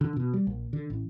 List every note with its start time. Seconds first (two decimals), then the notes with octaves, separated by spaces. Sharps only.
0.01 D3
0.16 B2
0.34 G3
0.47 A#1
0.73 D3
0.90 A1